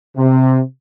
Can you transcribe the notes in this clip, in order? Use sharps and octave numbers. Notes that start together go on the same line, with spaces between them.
C3